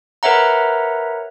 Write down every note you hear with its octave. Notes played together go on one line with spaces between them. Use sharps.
A#4 B4 C#5 E5 F#5 A#5